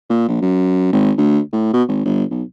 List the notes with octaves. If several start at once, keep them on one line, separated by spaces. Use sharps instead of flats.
A#2
A#1
F#2
G#1
D2
A2
B2
G#1
G1
B1